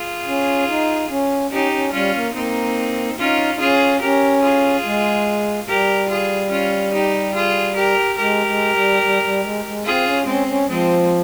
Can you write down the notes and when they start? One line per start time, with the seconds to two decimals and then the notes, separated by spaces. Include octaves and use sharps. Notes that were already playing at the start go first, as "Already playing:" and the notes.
Already playing: F4 G#4
0.27 C#4
0.68 D#4
1.10 C#4
1.51 C#4 D#4 G4
1.72 C#4
1.92 G3 C#4 F4
2.14 A#3
2.34 A#3 C4 D#4
3.18 C#4 D#4 F4
3.54 D#4
3.60 C#4 F4 G#4
4.02 C#4 G4 A#4
4.43 F4 G#4
4.85 G#3
5.68 G3 G4 A#4
6.09 F4 G#4
6.51 C#4 F4
6.93 D#4 G4
7.35 F4 G#4
7.76 G4 A#4
8.18 G#3 G4 A#4
8.46 G#3
8.74 G3
9.02 G3
9.22 G3
9.43 G#3
9.65 G#3
9.85 C4 F4 G#4
10.05 C#4
10.27 G#3 C4 C#4
10.47 C#4
10.68 F3 G#3 C4